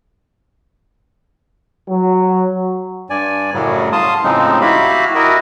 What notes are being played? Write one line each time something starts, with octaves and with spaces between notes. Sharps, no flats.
F#3
G2 D5 G#5
F#2 A2 C#3 F#3 G3
F5 A5 C6 D#6
A2 C#3 F3 G#3 C4 D#4
E4 F#4 G4 F5 B5
E4 F#4 A#4 D#5